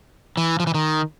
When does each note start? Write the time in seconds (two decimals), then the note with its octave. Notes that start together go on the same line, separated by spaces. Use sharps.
0.37 E3
0.60 F3
0.67 E3
0.74 D#3